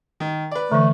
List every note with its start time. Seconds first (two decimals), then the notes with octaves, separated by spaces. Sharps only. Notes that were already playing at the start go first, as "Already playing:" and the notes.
0.20 D#3
0.51 B4 D5
0.72 D3 E3 A3